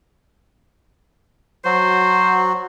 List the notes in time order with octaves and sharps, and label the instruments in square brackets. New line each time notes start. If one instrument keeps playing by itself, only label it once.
[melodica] F#3 F#4 [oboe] C5